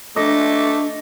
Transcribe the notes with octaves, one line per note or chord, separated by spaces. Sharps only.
A3 D4 D#5 D6